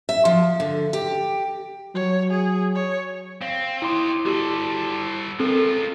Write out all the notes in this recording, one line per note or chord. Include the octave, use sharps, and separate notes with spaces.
E5
F3
D3
G4
F#3 C#5
G#4
C#5
C4 F5
D#4 E4 G4 C6
G3 F#4 G4 A4
G#3 C4 F4 A4 A#4